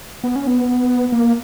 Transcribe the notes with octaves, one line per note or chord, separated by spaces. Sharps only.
B3
C#4
B3
A#3